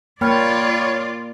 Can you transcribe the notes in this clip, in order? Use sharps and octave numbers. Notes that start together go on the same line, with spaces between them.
A#3 F4 C#5 D5 G5 B5 F6